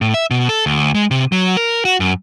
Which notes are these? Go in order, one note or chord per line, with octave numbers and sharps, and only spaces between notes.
A2
E5
B2
A4
D2
G#3
C3
F#3
A#4
F#4
F#2